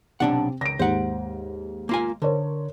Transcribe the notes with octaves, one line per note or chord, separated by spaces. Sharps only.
B1 C3 C4 D4 F#5
C#2 A#6 D7
D#2 G#2 C5 F#5
A#3 F4 G#5
D3 A#4 C5 C#5